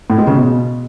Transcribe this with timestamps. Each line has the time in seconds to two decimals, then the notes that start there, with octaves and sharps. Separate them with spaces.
0.10 A2
0.18 G#3
0.27 C#3
0.36 B2